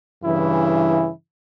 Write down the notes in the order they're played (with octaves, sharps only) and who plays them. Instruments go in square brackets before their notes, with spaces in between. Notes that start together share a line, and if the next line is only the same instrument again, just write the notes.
[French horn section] G2 C#3 E3 [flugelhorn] E4